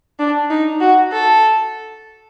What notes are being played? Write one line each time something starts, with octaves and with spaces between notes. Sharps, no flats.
D4
D#4
F#4
A4